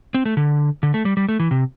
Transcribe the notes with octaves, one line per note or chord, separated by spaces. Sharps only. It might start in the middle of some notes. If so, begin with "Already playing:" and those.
C4
A3
D3
D3
A3
G3
G3
A3
E3
C3